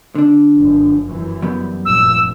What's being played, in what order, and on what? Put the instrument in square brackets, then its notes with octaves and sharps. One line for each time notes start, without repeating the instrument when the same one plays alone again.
[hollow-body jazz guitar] D3 D4
[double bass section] F1 F#2
F#2 C3 E3
[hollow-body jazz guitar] F#3 G3 B3
[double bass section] F1 G2 A#2 [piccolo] E6